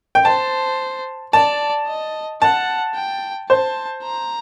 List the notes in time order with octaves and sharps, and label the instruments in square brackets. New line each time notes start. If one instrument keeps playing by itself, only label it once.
[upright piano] G5
[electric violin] C5 [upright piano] A5
[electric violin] D5 [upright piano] A5
[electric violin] D#5
[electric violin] F#5 [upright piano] A5
[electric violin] G5
[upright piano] C5 [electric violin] A5
[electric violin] A#5